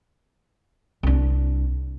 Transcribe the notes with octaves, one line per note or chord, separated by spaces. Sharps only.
C2 D4